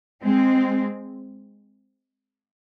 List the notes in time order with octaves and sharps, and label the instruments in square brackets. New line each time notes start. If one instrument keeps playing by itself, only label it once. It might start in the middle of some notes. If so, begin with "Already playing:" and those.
[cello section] G#3 C4